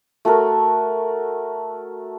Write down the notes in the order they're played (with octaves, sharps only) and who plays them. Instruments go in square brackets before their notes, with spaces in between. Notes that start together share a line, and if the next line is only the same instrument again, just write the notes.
[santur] A3 F#4 A4 A#4